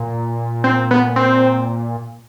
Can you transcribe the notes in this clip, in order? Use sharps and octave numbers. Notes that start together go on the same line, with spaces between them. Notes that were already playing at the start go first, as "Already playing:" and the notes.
Already playing: A#2
C4
B3
C4